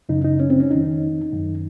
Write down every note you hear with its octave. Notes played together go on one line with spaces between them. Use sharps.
F#2 C#3 D#4
D#4
C#4
C4
C#4
F2 D#3 D#4
F#2 D#3